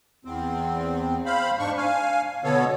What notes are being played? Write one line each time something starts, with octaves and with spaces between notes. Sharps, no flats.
E2 C4
C5 F5 B5
G#2 D4 C#6
F5 G#5
B2 D3 B3 A4 C#5